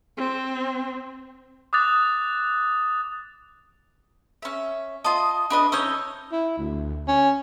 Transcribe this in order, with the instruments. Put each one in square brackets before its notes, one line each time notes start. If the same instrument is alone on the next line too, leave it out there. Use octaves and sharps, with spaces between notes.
[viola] C4
[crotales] D6 D#6 F#6 A6 F7
[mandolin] C#4 E5
[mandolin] F4 D#5 [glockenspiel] A5 D#6
[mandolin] D4 B4 D#5
[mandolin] C#4 D#4 C#5 [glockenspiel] E6 G6 G7
[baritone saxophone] E4
D2
C#4